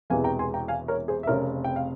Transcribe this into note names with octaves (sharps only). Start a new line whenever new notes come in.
E1 E2 C3 E3 G#3 F5 G#5
G5 A#5
G#5 C6
G5 A#5
F5 G#5
A#4 C#5
G#4 C5
E5
F1 F2 C#3 A#4 C#5
G5
F5